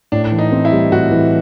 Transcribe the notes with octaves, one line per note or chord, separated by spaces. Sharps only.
A2 D4
E3
D#4
C4
E4
G3
A2 F#4
E3